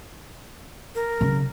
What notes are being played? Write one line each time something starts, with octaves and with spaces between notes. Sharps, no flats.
A#4
C#3 F#3